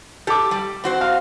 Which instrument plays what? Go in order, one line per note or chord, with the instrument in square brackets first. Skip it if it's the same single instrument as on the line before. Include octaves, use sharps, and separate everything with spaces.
[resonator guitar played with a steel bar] G4 [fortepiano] A4 D6
[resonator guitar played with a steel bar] G3
C4 F#4 C5
[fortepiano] F5